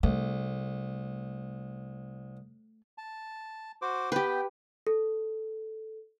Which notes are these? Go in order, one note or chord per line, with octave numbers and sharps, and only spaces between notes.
C2 A3
A5
F#4 C5 D6
B3 G4 B4 G5
A4